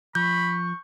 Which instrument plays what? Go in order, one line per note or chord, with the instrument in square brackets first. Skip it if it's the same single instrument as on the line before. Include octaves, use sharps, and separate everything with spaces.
[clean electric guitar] F3 [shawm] B5 [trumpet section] C#6 [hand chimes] G6